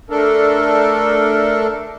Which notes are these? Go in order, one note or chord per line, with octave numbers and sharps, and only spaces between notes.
A3 D4 A4 A#4